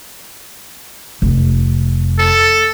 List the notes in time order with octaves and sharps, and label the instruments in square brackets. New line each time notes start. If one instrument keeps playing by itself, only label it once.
[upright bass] F1
[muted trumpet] A4